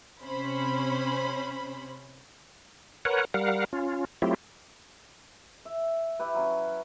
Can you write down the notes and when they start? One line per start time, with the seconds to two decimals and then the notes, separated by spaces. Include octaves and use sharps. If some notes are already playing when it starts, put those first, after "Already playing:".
0.20 C3 C#4 C5 B5
3.05 A#4 B4 C#5 F#5
3.34 G3 A#4 F5 F#5
3.73 C#4 F4
4.22 F#3 A3 C4 E4 F4 G4
5.65 E5
6.19 E4 G4 B4
6.35 F#3 C#4